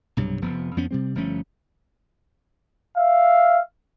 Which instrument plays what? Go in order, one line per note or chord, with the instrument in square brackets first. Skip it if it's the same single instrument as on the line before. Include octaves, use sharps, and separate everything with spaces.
[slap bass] B1 G2 C3 F#3
F1 F3 B3
F2 F3 B3 C#4
C3 G3 C4
G1 F3 A3 C#4
[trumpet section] E5 F5